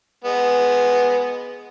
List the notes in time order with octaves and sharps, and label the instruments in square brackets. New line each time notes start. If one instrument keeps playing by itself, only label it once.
[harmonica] G#3 B3